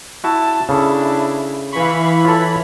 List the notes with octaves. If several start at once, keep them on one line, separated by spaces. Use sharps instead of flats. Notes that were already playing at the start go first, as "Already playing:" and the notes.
E4 F#4 A5
C#3 D4 E4 A4
E3 F5 B5 C#6
F4 A4 C#5